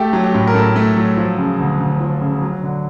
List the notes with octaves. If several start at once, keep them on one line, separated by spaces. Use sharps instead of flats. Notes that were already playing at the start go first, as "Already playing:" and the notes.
Already playing: A3 G4
F#3
G4
A2
A#4
A2 A4
A3
F#3
F3
C#3
D2
D2
F3
C#3
F#3
D3